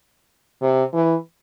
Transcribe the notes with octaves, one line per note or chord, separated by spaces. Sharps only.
C3
E3